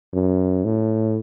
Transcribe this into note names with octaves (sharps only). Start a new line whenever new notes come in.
F#2
A2